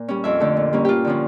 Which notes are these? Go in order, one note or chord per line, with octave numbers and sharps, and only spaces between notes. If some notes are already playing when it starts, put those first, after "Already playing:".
Already playing: A#2
G3 C#4
F2 E5
D3 A3
A#2
G3 A#3 C#4
G2 F4 G4
D3 F3 C#4